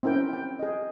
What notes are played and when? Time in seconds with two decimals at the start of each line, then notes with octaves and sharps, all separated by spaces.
0.03 C4 C#4 E4 A#4 G5
0.33 G5
0.59 G#4 D#5